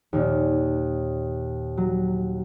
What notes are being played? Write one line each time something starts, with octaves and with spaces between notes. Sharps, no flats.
D#2 A#2
F#3